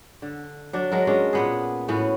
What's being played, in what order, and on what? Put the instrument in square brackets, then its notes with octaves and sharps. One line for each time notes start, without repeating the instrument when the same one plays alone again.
[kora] D3
F#3 D4
F#3 G#3 A#4
G#3 C#4 D4
A#2 B3 G#4
A2 B3 C#4 F#4